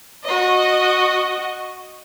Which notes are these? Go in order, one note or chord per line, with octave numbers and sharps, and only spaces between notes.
F#4 D#5